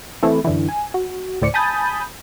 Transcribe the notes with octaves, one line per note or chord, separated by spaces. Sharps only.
E3 A3 C4 E4
F#2 D3 E3
G#5
F#4
D2 A2 C5 D5 D6 C#7
G#5 A5 B5 D#6 G6 A6